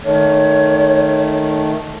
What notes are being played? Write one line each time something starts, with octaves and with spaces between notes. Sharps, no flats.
D#3 A3 C#5